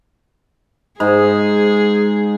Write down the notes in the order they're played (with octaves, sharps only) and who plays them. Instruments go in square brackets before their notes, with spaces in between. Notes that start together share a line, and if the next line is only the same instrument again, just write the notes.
[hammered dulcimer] G#2 [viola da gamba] G#4